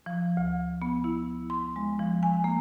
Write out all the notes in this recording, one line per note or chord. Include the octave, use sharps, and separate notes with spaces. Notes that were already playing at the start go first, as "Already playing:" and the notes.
F3
D2
B3
E4
C6
G#3
F3
G#5
A#3